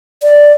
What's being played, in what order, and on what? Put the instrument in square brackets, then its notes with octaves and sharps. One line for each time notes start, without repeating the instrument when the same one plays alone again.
[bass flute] D5